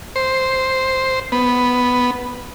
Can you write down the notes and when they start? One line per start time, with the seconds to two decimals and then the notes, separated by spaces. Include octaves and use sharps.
0.16 C5
1.32 B3